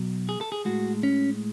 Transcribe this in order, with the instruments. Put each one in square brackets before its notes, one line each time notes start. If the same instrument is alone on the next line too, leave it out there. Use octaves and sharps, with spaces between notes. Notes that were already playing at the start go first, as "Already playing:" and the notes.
Already playing: [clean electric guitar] B2 F#3
G#4
A4
G#4
A2 G#3 F#4
C#4